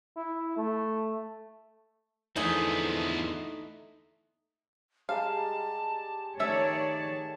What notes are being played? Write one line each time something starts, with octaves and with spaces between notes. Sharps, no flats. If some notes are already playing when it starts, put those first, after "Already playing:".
E4
A3
E2 D3 F3 A3 B3 D#4 E4 G#4
G3 G#3 F5 A5 A#5
D#3 A3 C#5 D5 E5 A5